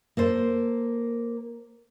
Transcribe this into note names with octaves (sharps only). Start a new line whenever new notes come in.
A#3 A4 C5